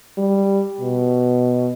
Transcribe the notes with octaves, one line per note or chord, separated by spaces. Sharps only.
G3
B2